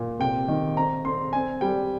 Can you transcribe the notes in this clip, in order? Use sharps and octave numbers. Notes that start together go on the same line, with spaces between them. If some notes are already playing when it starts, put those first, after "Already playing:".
Already playing: A#2
C3 G5
D#3
C4 A#5
C4 C6
C4 G#5
G3 G5